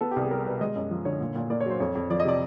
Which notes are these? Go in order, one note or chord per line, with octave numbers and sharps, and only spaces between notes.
B3 A4
G4
C2
G#4
G3 A#4
B2 B4
G#3 D#5
F#2 D#5
F3
D3 C#5
A#2
A#2
A#3 D5
C#5
F#3 C5
F2 C#5
F2
F3 D5
D#5
C3 D5